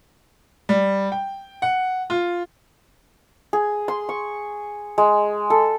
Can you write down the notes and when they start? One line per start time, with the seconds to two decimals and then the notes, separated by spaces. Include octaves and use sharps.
0.69 G3
1.12 G5
1.62 F#5
2.10 F4
3.53 G#4
3.88 C6
4.09 C#6
4.98 G#3
5.50 A4